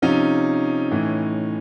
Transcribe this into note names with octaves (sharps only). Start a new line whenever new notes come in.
C3 F3 C#4 D#4
A2 E3